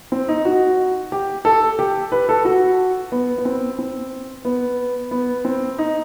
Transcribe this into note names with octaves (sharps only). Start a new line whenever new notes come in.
C4
D#4
F#4
G4
A4
G4
B4
A4
F#4
B3
B3
C4
C4
B3
B3
C4
D#4